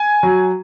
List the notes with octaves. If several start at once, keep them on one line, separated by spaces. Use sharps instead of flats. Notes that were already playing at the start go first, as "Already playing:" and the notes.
Already playing: G#5
F#3